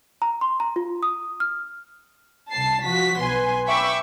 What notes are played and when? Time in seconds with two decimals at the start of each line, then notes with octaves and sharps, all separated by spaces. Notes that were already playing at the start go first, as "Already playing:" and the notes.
0.22 A#5
0.41 C6
0.60 A#5
0.76 F4
1.03 D#6
1.40 F6
2.51 C2 A5 C7
2.85 F3 F#4 B6
3.20 B1 B4 G#5 C6
3.67 E5 G5 B5 C#6 D6 E6